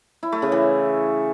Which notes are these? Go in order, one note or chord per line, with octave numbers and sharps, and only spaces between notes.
E4
A3
C#3
E3